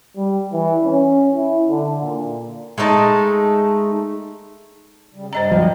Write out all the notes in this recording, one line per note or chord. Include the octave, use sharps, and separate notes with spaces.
G3
E3
C#4
E4
D3
A#2
G#3 A3 D#4 A5
C#3 G3
G2 G3 C5 D#5 A#5
F3 F#3